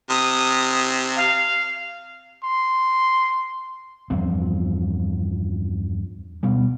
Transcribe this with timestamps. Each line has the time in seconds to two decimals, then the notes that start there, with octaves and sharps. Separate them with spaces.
0.10 C3 D#6
1.16 F5
2.43 C6
4.10 E2 G2 F3 C4
6.43 B2 G3